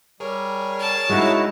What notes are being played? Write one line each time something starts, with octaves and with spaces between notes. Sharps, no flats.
G3 G#4 A#4 C#5
A5
C#3 G#3 D#4 E4 F#4